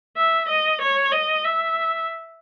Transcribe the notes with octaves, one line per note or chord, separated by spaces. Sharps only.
E5
D#5
C#5
D#5
E5